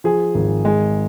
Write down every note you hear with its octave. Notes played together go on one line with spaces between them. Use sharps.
F3 G#4
G#1
G#3